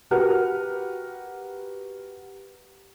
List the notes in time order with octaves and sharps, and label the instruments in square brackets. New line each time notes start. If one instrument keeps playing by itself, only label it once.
[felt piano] F#4 G4 A#4 B4 F#5 F6